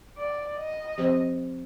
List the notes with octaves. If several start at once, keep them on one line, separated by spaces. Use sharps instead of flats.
D5
D#5
F3 C4 G4 C5